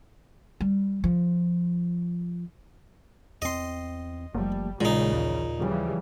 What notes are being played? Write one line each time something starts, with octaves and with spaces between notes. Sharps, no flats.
G3
F3
E2 C4 D#5 C6
F#1 F3 G3 A3 A#3
A#1 A#2 C#3 E3 G#3 D#4
D#2
C#3 E3 F3 G3